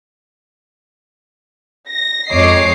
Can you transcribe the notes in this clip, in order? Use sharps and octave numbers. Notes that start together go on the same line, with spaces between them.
A#6
F2 G#3 C#5 D#5 D6 C7